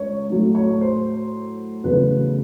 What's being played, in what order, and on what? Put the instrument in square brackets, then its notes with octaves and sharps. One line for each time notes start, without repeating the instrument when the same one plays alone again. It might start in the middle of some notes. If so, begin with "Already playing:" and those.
Already playing: [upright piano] C#2 C#5
A2 F#3 A3
C#5
C5
E2 C#3 F#3 A3 B4